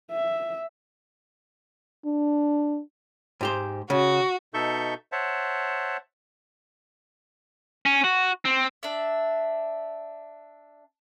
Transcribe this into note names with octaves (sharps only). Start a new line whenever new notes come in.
E5
D4
G#2 G4 C5
C#3 F#4
B2 D#4 A4 E5 C#6 G6
C5 C#5 E5 F#5 A5
C#4
F#4
C4
D4 E5